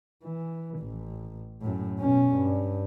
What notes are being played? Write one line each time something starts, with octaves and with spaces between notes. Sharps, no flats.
E3
A1
F#2 A2
B2 C#4
G2